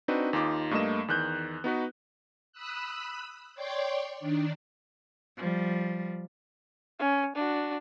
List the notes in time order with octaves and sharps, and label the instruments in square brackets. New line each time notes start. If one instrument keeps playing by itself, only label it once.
[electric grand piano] C4 D4 D#4 F#4 B4
D#2 D#4 F4 D6
G2 A3 A#3 D#5 E7
E2 D#3 F#6 G6
B3 D#4 F#4 B4
[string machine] B5 D#6 E6 F#6
C#5 D5 G5 C6 D6
D#3 D4
[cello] F3 G3
[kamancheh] C#4
D4 F#4